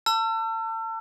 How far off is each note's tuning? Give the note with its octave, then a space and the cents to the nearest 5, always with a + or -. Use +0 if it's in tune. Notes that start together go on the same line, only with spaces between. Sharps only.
A5 +35 E6 +40